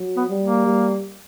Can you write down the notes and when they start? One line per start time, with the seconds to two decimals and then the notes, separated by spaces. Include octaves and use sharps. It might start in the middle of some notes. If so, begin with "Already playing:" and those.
Already playing: F#3
0.17 B3
0.30 G3
0.41 A#3
0.66 G3